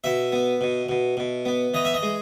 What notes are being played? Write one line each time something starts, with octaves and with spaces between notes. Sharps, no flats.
B2 E5
B3
B2
B2
B2
B3
E3 D#5
E5
D#5
G#3